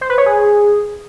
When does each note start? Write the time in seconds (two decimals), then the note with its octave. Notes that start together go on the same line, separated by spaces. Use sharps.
0.01 C5
0.09 B4
0.18 C#5
0.26 G#4